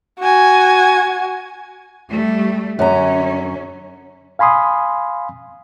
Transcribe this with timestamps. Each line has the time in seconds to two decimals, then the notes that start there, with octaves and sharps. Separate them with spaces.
0.19 F#4 G#5
2.10 G3 A3
2.79 F#2 D3 C#4 A#5
4.39 F5 G#5 B5 C6 D#6